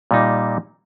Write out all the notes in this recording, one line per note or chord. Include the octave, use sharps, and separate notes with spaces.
A#2 G3 D#4